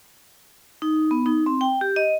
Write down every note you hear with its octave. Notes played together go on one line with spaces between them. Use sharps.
D#4
B3
D#4
C4
G5
G4
D#5